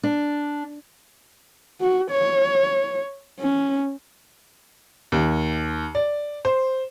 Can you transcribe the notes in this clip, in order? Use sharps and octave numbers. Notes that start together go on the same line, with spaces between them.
D4
F#4
C#5
C#4
D#2
D5
C5